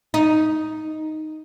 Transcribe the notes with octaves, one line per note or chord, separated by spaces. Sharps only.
D#4